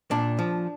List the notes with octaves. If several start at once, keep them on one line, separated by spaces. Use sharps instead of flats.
A#2 D4
F3